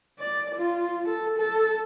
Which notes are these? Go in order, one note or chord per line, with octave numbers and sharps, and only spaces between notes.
D5
F4
A4
A4